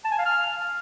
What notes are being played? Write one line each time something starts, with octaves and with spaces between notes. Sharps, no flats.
A5
G#5
F5
F6